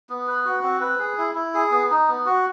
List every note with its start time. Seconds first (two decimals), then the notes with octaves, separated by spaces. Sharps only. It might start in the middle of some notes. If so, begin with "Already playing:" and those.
0.10 B3
0.27 B4
0.45 F#4
0.63 C4
0.81 B4
0.99 G#4
1.18 E4
1.35 E4
1.54 G#4
1.71 B3
1.90 D#4
2.08 B3
2.26 F#4